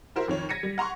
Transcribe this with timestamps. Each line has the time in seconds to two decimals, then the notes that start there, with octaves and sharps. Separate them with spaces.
0.16 E4 F#4 A#4 C5 E5
0.28 F2 D#3 C#5
0.49 G#6 A#6 B6 C#7 D#7
0.63 G3
0.78 F#5 A#5 C6 C#6